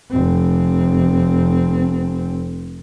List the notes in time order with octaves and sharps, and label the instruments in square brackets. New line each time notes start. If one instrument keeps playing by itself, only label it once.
[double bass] F1 C4